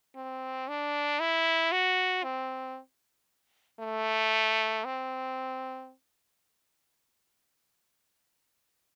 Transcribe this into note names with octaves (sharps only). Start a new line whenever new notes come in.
C4
D4
E4
F#4
C4
A3
C4